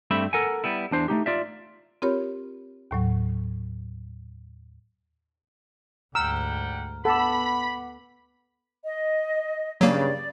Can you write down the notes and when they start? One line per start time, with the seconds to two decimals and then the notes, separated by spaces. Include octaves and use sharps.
0.11 G2 A3 C4 G4 E5 B5
0.33 A4 A#4 F#5 G#5
0.64 G3 B3 E4
0.91 E2 D4 C5
1.08 A3 A#3 D#4 G4
1.26 F4 D5 E5
2.02 C4 F4 G4 A#4 C#5 B5
2.91 D#2 A2 F#3
6.15 D2 G#2 G3 F#5 G5 A#5 E6 F6
7.05 B3 A4 F#5 B5 D6
8.84 D#5
9.81 G2 C#3 F#3 A#3 D5